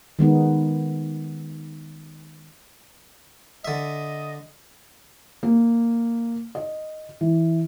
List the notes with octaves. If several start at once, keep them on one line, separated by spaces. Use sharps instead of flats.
D#3 G#3 B3 D#4
D3 D#5 E5
A#3
D#5
E3